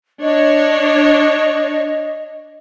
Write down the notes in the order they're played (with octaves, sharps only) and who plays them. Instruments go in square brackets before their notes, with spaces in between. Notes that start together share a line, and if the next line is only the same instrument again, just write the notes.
[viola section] D4 C#5 [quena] D#5